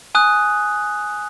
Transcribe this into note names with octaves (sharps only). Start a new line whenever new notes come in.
G#5 D#6 F#6